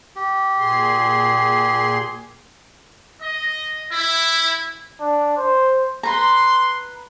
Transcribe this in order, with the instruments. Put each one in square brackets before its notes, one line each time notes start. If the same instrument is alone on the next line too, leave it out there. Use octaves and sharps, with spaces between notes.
[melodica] G4
[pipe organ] A#2 G#4 C6
[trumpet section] D#5
E4
[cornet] D4
C5
[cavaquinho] B4 A#5 [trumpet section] C6